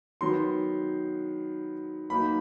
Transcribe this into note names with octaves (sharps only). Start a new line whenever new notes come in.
D#3 F#3 B3 C6
F#3 A#3 D#4 B5